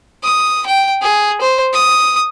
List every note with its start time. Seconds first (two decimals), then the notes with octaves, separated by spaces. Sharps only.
0.23 D#6
0.66 G5
1.02 G#4
1.41 C5
1.73 D#6